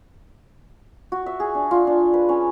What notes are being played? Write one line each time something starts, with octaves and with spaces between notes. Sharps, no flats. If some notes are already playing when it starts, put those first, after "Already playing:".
F#4
E5
G#4
D4
F4
D4
B4
C#4